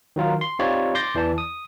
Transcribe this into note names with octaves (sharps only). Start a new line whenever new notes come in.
D#3 F#3 F4 A#4
C6
C4 D#4 F4 G4 C#5 D5
C6 D6 G6 A6 A#6
E2 E3 D5 A5
D#6